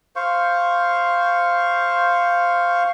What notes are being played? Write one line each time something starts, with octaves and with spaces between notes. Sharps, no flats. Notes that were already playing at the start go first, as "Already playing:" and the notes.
C5 F5 C#6